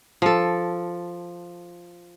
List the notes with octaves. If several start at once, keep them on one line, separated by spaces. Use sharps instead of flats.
F3 A4